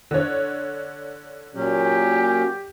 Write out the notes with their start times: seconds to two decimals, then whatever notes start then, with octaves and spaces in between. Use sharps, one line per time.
0.11 D3 C#5
1.55 A#2 F#3 C#4 G4